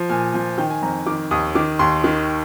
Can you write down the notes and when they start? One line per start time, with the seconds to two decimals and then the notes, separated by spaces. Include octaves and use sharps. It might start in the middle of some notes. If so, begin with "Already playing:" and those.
Already playing: F3
0.09 A#2 G#5
0.34 F3
0.58 D#3 G5
0.70 G#5
0.82 F2 A#5
1.06 D#3 D6
1.31 D#2 D#6
1.55 D#3 D6
1.79 D#2 C6
2.04 D#3